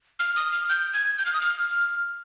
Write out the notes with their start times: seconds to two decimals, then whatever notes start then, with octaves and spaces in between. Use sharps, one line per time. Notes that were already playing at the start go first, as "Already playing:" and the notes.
0.19 F6
0.36 D#6
0.52 F6
0.69 G6
0.94 G#6
1.18 G6
1.26 F6
1.34 D#6
1.41 F6